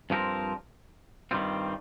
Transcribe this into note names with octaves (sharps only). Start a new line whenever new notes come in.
G2 F3 C4 G4 A#4
G2 D#3 G3 C4 F4